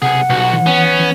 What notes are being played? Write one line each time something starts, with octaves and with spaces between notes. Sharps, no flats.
B1 C3 G#4 F#5
B1 G2 F#4
E3
B3 C#4
E3